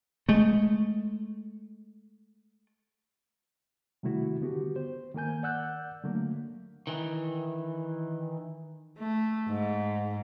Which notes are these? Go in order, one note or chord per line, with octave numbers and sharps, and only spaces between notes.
G#3 A3
C3 D#3 G3 A3 E4 F#4
D3 B3 F#4 G4
C5
D#3 A#3 A#4 G#5 G6
D5 F#5 E6 F#6 G6
D3 F#3 A3 A#3
D#3 E3
A3
G#2